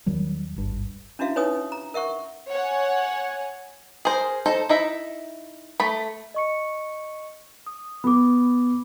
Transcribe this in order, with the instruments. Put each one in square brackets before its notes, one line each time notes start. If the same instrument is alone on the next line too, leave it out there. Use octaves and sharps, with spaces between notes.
[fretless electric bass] E2 D#3 F#3 G3
D#1 G#1 G2
[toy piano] C#4 D4 E4 F#4 E5 F5
D#4 B4 C#5 G#5 D#6
A#5
A#4 E5 F#5 C#6
[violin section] C#5 F#5 G#5
[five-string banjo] G#4 A#4 C5
D#4 A4 C5
D#4 E4 E5
A3 B5
[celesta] D#5 C#6 C#7
D#6
[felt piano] B3 [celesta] B5 D6